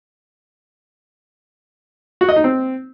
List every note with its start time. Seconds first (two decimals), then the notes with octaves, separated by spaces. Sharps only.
2.21 F#4
2.29 D#5
2.36 D#4
2.44 C4